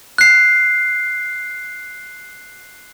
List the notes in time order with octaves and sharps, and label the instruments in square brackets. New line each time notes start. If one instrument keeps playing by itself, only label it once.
[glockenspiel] F#6 C7